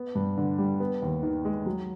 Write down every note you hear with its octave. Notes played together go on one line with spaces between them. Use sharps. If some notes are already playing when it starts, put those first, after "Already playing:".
Already playing: B3
G2
D3
G3
B3
D#2
D#3
G#3
F#3